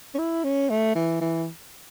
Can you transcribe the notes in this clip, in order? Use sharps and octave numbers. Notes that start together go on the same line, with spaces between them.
C#4
E4
C#4
A3
E3
E3